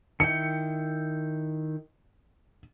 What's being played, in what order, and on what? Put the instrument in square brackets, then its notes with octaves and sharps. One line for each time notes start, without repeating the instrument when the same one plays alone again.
[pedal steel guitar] D#3 E4 G5 [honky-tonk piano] C#7